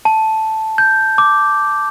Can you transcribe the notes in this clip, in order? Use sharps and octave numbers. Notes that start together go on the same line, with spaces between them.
A5
G6
D6